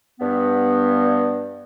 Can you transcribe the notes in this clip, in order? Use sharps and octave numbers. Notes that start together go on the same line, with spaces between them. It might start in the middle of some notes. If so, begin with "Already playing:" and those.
G2 B3